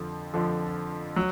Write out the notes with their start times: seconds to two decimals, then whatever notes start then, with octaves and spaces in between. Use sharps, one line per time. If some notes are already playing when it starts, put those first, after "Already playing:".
Already playing: F2 D3 F3
0.34 F2 D3 F3
1.16 F#3